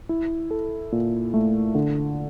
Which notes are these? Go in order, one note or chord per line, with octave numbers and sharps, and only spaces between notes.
E4
A4
A#2
A3
D3